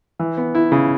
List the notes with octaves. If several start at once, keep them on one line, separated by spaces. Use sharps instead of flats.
E3
B3
E4
C#3